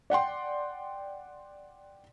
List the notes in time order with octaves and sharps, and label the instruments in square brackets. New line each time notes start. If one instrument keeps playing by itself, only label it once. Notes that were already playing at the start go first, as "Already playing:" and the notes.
[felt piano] D5 F#5 G5 C6